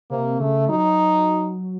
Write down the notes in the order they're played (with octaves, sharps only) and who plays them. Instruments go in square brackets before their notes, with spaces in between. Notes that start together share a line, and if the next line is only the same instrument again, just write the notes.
[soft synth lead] C3 [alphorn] A#3
[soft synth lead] C#3 [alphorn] A3
[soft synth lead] F#3 [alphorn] D#4